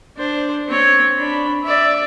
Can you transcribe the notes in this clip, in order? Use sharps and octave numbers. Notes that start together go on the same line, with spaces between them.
D4 C5
C4 C#5
D4 B5
D5 E5